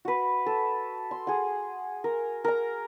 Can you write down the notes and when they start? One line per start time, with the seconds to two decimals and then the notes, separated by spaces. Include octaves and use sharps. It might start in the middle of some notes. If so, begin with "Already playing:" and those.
0.05 F#4 B4
0.46 A4
1.11 C6
1.27 G#4 F#5
2.04 A#4
2.44 A#4 A#5